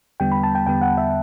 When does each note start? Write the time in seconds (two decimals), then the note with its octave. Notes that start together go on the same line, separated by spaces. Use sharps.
0.20 E2 D3 G3 B3 G5
0.32 B5
0.43 A5
0.55 G5
0.67 E2 D3 G3 B3 G5
0.82 F#5
0.97 E5